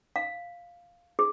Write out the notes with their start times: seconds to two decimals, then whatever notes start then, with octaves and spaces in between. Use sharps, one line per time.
0.16 F5
1.19 G#4